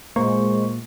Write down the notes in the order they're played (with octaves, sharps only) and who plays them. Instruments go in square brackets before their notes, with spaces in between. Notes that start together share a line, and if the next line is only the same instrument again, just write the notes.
[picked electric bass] A#2 A#3 [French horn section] G#3 [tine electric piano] C5 C#6